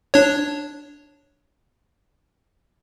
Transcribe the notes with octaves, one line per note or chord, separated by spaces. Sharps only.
D4 C#5